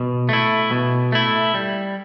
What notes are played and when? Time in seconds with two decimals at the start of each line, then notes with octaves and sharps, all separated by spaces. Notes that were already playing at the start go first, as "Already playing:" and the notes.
Already playing: B2
0.29 A3 E4
0.71 B2
1.12 A3 E4
1.54 G3